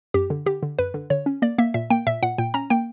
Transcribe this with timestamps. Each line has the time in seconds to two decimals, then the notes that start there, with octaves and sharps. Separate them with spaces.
0.14 F#2 G4
0.30 D3
0.46 D3 G4
0.63 D3
0.78 F#2 B4
0.94 D3
1.10 D3 C#5
1.26 C#4
1.42 A#3 D5
1.58 A#3 E5
1.74 A#2 E5
1.90 A#3 G5
2.07 A#2 E5
2.22 A#2 F#5
2.38 A#2 G5
2.54 C#4 A#5
2.70 A#3 G5